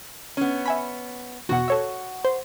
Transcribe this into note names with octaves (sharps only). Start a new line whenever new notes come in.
B3 C#4
E5 G#5 B5
E2 B2 F#4 F#5
A4 C#5 E5
C5